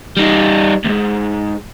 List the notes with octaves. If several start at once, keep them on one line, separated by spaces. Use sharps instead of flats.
G3 D#4
D2 G#2